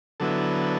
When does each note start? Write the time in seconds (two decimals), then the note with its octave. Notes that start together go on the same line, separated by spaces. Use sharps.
0.20 D3 F#3 B3 E4 A4